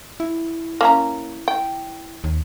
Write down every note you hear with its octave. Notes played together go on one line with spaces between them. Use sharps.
E4
A#3 C#4 A#5
G5
D#2